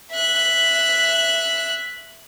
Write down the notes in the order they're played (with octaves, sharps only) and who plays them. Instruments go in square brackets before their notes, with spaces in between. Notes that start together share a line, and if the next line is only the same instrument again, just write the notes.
[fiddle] E5 F#6